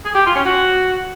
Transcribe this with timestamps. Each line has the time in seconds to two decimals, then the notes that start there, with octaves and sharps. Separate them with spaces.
0.04 G#4
0.15 G4
0.25 F4
0.35 C#4
0.45 F#4